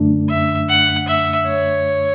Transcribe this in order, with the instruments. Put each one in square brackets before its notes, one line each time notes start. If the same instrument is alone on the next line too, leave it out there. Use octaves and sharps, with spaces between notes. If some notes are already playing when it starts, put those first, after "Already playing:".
Already playing: [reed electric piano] F#2 D3 A3 D4
[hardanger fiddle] E5
F#5
E5
C#5